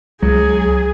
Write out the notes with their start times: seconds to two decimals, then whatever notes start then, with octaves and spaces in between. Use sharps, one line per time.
0.22 C#2 F#3 G#4